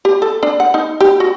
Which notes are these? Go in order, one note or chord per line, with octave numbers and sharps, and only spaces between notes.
G4
A4
D4
F#5
D#4
G4
F#4